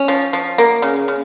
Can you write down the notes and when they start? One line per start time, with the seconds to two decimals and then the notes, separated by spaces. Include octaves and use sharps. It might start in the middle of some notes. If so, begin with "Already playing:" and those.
Already playing: C#4
0.08 F3
0.33 F3
0.58 A#3
0.82 C#3
1.08 C#3